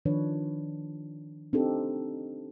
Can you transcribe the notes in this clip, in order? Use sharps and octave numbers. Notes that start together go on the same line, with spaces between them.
D#3 F3 D4 B4 C#5
C4 D4 D#4 G4 A4